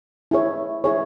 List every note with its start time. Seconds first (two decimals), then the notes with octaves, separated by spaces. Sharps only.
0.31 E4 G#4 C#5
0.84 E4 G#4 C#5